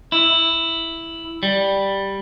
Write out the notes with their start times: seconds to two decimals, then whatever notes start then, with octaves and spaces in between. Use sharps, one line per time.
0.12 E4
1.43 G3